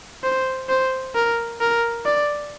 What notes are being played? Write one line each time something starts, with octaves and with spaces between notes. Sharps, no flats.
C5
C5
A#4
A#4
D5